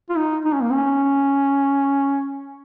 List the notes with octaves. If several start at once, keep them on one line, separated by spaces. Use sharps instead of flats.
F4
D#4
D#4
C#4
A#3
C#4